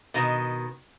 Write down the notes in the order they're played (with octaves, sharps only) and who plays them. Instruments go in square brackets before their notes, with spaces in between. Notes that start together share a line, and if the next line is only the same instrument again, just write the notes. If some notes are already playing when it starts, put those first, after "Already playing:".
[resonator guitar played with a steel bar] B2 D#3